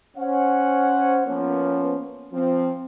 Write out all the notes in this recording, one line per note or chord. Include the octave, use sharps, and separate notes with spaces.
C#4 C5 F#5
F3 A#3 B3 C#4
F3 C4